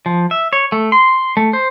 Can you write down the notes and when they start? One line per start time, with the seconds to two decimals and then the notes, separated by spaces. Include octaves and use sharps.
0.06 F3
0.31 E5
0.53 C#5
0.72 A3
0.92 C6
1.37 A3
1.53 C5